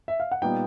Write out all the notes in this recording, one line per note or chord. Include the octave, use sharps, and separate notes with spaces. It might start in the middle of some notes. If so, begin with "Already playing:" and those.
E5
F5
F#5
A#2 G3 B3 D#4 G5